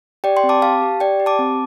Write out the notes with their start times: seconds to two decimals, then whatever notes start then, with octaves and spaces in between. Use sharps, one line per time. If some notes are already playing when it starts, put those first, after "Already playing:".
0.24 G4 D5 G5
0.37 G5 C6
0.43 C4
0.49 A5 D6
0.62 G4 F5 A5
0.82 G4
1.00 G4 D5 G5
1.20 G4
1.26 A5 D6
1.39 C4